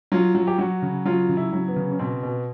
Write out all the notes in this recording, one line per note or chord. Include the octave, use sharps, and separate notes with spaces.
F#3 F4
F#3
G4
F#3 F#4
C#3
F#3 F4
C#3
E4
F#3
B3
C#3
C#4
B2 C4
B2